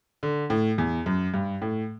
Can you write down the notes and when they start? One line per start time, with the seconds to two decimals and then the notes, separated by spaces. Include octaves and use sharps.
0.23 D3
0.50 A2
0.78 E2
1.06 F#2
1.34 G2
1.62 A2